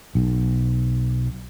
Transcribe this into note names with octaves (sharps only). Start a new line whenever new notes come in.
B1